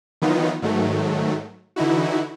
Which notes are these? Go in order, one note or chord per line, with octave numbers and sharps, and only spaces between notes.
D#3 E3 F#3 B3 D#4 F4
G#2 D#3 F#3 A3
D3 E3 D#4 E4 F#4